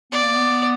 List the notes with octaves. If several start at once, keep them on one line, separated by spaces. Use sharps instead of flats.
B3 D5
A#3
B3